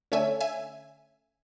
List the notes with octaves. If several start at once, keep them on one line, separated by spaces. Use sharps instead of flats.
D3 A3 C#4 E5 G#5
E5 G#5